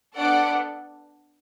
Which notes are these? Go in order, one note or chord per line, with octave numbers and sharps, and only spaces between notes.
B3 D4 A4 D5 F#5